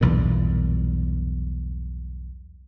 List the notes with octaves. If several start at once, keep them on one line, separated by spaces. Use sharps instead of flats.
B1 E2 G2 A#2